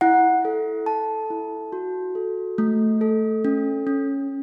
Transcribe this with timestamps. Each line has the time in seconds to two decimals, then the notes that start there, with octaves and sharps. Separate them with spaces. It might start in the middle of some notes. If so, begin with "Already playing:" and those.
0.01 E4 F#5
0.45 A4
0.86 A4 A5
1.30 E4
1.72 F#4
2.15 A4
2.58 A3
3.01 A4
3.45 C#4
3.87 C#4